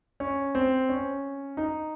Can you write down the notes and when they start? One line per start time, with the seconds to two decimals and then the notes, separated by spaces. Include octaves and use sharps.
0.20 C#4
0.55 C4
0.89 C#4
1.57 D#4